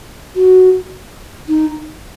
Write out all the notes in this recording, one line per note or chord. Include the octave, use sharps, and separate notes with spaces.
F#4
D#4